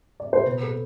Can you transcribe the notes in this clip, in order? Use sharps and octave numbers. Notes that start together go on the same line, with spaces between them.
D5
C5
B2 B4
A4